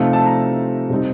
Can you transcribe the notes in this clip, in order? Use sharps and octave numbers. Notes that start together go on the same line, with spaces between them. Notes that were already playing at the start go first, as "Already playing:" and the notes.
Already playing: C3 F3 A3 C4 D#4 F5
A5
A#5
C3 G3 C4 D#4